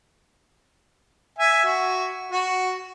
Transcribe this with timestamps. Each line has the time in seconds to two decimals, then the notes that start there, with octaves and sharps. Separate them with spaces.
1.38 E5 G#5
1.65 F#4
2.32 F#4